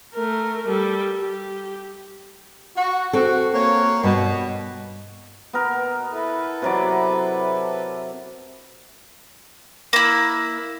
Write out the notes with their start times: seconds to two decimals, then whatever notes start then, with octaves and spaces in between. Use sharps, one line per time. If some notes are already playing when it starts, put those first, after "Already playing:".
0.14 A3 A#4
0.68 G3 A4
1.21 G4
2.76 F#4
3.13 C4 F#4 A4
3.54 A#3 C#5
4.03 G2 B2
5.53 B2 B3 A#4
6.11 E4 A4 B4
6.62 C3 F#3 D5
9.93 A#3 E4